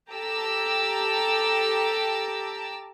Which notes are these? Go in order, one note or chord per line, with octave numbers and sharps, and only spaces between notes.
G4 A4 A5 A#5 D6 E6